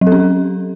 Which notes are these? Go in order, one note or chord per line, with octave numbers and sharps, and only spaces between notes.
F#3
A4
C#4